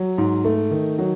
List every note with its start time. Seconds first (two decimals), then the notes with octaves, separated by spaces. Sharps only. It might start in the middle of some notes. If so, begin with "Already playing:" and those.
Already playing: F#3
0.18 G#2
0.45 A3
0.71 D#3
0.98 F#3